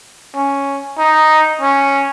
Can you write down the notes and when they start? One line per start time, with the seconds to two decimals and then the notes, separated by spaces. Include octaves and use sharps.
0.35 C#4
0.98 D#4
1.61 C#4